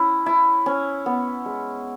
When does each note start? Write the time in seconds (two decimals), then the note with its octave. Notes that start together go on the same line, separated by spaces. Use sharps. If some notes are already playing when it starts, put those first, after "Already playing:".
Already playing: C#4 E4
0.26 E4
0.66 C#4
1.06 B3
1.46 G#3